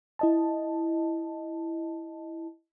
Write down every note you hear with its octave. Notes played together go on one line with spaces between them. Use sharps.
E4 D#5 A5